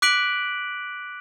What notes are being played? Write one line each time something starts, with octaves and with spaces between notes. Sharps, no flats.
D6 F#6 B6 D7 F#7